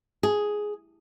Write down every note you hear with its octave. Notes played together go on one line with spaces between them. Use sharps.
G#4